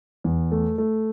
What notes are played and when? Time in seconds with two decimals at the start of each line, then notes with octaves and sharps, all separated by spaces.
0.24 E2
0.51 A3
0.78 A3